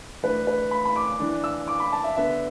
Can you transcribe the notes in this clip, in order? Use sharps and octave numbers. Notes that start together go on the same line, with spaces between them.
E3 A3 D4 B4
B4
B5
B5
D6
E3 D4
E6
D6
B5
A5
E5
D3 B3 D4 E5